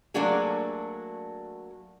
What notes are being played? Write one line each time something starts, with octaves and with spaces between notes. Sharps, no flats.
F#3 A3 A#3 D4 F#4 G#4